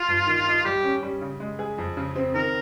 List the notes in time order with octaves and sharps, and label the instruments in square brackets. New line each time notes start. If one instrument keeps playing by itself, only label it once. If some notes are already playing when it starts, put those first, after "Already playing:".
Already playing: [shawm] F4
[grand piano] G2
D#3
D#4
[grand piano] G3 [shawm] G4
[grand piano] C#4
G3
C#3
G#3
G#4
F2
C#3
C4
[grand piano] D#3 [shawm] A#4